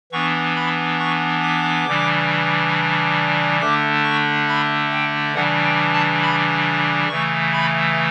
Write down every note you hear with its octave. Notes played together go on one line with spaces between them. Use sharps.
E3 B3 D4 C#6
B5
C#6
D6
C#3 E3 G3 D4
D3 A3 D4 D6
C#6
B5
G5
C#3 E3 G3 D4 F#5
G5
A5
B5
C#3 E3 A3 C#6
B5